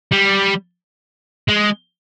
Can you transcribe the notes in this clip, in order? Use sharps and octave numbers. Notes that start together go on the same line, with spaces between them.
G3
G#3